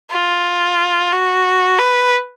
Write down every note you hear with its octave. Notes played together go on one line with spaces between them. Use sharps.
F4
F#4
B4